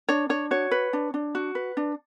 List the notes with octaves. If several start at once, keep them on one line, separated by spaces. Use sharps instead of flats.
D4 C#5
D4 C#5
F#4 C#5
B4
D4
D4
F#4
B4
D4